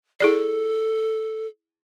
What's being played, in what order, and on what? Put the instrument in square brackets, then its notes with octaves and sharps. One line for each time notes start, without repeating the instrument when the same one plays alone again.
[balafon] E4 G#4 D5 [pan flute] A4